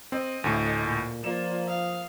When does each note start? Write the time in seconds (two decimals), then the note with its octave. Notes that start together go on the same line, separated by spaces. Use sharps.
0.12 C4 D#5
0.44 D2 A2 A3 G#5 A5 G6
0.83 A#2
1.24 F3 A#3 F4 D5 E7
1.68 F5 D#6